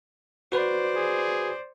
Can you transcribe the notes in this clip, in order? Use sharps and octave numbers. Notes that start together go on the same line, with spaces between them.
F#4 B4 C5 D5
G#4